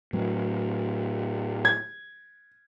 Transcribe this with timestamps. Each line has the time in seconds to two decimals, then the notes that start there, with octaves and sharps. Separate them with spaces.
0.13 A2 F#3
1.65 G#6